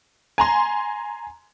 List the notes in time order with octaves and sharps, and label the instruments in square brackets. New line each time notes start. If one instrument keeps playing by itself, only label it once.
[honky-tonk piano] G#5 A#5 C6